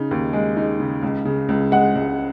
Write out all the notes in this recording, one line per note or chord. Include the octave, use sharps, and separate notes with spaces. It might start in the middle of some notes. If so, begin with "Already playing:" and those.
Already playing: C#3 D#4
D#2
G#3
D#4
C#3
C#2
C#3
C#2
G#3 F#5
C#2